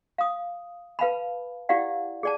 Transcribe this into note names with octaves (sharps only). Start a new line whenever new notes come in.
F5 D#6
B4 F5 A5 B5
E4 G4 D5 F5 F#5
G#4 D5 A5